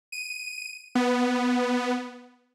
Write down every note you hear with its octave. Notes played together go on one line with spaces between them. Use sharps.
D#7
B3